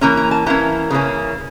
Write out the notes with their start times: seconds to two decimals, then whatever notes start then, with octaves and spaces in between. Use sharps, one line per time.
0.01 E3 A#3 C#4 A#5
0.17 A#5
0.31 A5
0.46 E3 A#3 C#4 A#5
0.90 C#3 E3 A#3 C#4